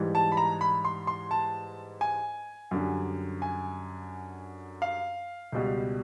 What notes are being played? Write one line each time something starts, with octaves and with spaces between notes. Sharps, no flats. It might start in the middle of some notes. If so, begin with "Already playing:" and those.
Already playing: G#2 E3 G3
A5
B5
A#5
B5
C6
C6
A5
G#5
F#2 D3 G3
G#5
F5
C#2 B2 G3